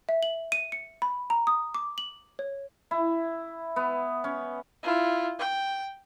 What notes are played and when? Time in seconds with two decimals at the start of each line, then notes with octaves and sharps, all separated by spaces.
0.09 E5
0.23 F#7
0.52 D#7
0.72 C#7
1.02 B5
1.30 A#5
1.47 D#6
1.75 D6
1.98 F#7
2.39 C#5
2.91 E4
3.76 B3
4.24 C#4
4.83 E4 F4
5.39 G5